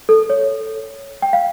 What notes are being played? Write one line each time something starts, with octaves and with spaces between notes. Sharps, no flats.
A4
C#5
G5
F5